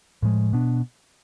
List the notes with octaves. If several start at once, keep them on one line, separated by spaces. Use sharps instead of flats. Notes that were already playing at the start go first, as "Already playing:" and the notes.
A2 F3 G#3
B2 B3 D4